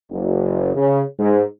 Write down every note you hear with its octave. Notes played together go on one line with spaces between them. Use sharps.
F#1
C#3
G#2